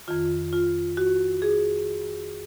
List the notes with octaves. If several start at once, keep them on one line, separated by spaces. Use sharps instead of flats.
F2 D#3 F4
F4
F#4
G#4